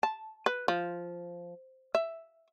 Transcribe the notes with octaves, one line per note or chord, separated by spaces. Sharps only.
A5
B4
F3
E5